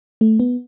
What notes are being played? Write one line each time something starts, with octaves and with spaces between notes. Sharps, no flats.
A3
B3